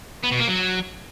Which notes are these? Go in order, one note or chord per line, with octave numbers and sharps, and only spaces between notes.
B3
B2
A#3
F#3